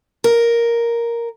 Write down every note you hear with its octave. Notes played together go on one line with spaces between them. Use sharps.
A#4